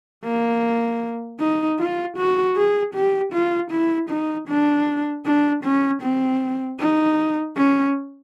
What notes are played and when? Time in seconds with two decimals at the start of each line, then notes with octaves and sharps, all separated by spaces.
0.25 A#3
1.40 D#4
1.79 F4
2.17 F#4
2.56 G#4
2.94 G4
3.33 F4
3.71 E4
4.10 D#4
4.48 D4
5.26 D4
5.64 C#4
6.03 C4
6.80 D#4
7.57 C#4